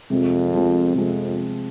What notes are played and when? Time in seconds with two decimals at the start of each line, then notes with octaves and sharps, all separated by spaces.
0.10 F2 C3 F3 G#3 C4
0.53 C3 F3 G#3 C4
0.95 F2 C3 F3 G#3 C4